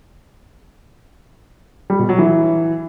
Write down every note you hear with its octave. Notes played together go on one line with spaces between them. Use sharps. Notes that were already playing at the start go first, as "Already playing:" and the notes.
G3
B2
F#3
E3